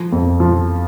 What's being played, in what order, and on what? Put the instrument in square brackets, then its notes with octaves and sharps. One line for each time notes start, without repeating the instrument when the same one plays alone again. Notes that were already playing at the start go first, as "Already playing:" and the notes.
Already playing: [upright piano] F3
F2
F3